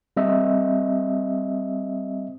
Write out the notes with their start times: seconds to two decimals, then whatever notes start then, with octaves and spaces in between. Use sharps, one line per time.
0.17 G3 C4 D#5 E5